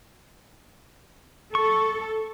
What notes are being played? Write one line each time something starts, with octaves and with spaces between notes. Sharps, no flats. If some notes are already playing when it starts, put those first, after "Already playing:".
A4 C#6